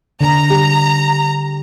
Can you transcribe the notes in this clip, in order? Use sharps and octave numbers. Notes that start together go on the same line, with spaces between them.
D3 A#5
G3